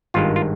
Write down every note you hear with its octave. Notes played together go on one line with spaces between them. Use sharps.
G#1 G2 D#3 G#3 F4
F4